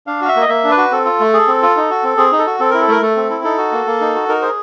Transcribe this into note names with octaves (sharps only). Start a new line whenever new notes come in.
D4 F5
F#4 F5
E5
A#3
D#5
A#3 E5
D4
B4
F#4
C4 A4
F4
A3
G#4
C4
F4
D#4
F#4
C4
C4 G#4
D#4
A4
F#4
C4 A4
E4 A#4
A4
A3 A#4
A3 A4
C4
E4
D#4 A4
F#4
A#3
A#3
D#4
F#4
D#4 A#4
G#4 C5